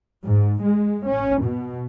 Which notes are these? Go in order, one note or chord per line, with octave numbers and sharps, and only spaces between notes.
G#2
G#3
C#4
B2